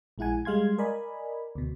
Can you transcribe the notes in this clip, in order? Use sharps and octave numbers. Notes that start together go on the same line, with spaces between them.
A#1 G#3 E4 F#5 G#5
G3 G#3 F5 C6 G#6
A#4 D5 D#5 G#5 B5
D2 B2